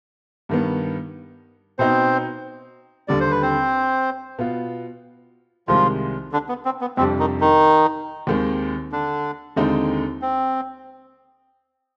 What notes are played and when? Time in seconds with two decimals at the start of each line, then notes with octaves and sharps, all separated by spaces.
0.49 G2 D#3 B3
1.79 B2 B3 C4 D#4 C5
3.08 D#2 D3 G3 D5
3.21 C5
3.31 B4
3.42 C4 C5
4.39 B2 B3 F4
5.68 C2 C3 D#3 F3 G#3 F4
6.32 D3 D4
6.49 B3
6.65 C4
6.81 B3
6.97 F2 C3 G3 C4 D4
7.19 D#3 D#4
7.41 D#3 D#4
8.27 D#2 D#3 G#3 C4
8.92 D3 D4
9.56 D#2 D3 G#3 C4 D#4
10.22 C4